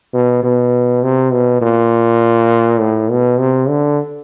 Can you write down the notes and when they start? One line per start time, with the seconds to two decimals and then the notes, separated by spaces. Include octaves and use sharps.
0.14 B2
0.43 B2
1.03 C3
1.33 B2
1.62 A#2
2.80 A2
3.10 B2
3.40 C3
3.69 D3